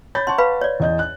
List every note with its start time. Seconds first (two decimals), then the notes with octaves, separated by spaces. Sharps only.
0.15 C#5 B5 G6 A6
0.27 F#5 A5 C6 C#6
0.38 B4 F5 B5
0.61 C#5 D5
0.80 E2 D#5 G6
0.99 F#6